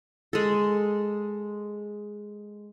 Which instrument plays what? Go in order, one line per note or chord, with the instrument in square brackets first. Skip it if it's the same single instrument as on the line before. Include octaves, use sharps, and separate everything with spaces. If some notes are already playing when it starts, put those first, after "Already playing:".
[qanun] G#3 A4